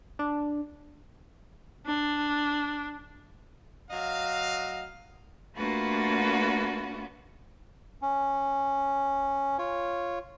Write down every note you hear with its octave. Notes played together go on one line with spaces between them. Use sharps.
D4
D4
F#3 D#5 F5
A3 A#3 D4 F4 F#4 B4
C#4
F4 C#5